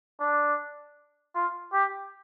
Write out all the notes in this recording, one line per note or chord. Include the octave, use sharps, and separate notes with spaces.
D4
F4
G4